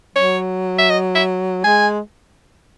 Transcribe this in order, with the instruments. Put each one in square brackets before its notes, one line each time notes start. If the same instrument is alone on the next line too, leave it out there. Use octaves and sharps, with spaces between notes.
[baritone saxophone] F#3 [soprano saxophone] C#5
[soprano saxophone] E5
D#5
E5
[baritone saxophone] G#3 [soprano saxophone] G#5